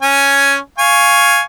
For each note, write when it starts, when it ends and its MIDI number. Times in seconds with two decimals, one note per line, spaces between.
0.02 0.58 61
0.02 0.58 80
0.78 1.42 77
0.78 1.42 80
0.78 1.42 85